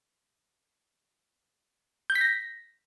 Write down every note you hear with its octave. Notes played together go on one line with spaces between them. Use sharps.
G6
B6
A#6